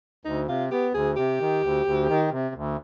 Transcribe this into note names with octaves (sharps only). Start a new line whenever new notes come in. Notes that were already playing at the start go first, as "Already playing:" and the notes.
D2 D#4
C3 F4
B3 G4
D2 G#4
C3 G4
D#3
D2
D2
D#3
C3
D2